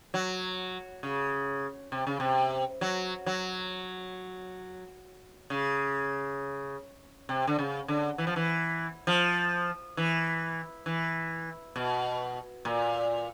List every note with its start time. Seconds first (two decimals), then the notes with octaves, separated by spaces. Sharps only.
0.14 F#3
1.03 C#3
1.92 C3
2.07 C#3
2.20 C3
2.81 F#3
3.26 F#3
5.50 C#3
7.29 C3
7.47 D3
7.59 C#3
7.88 D3
8.18 E3
8.27 F3
8.36 E3
9.07 F3
9.97 E3
10.86 E3
11.76 B2
12.65 A#2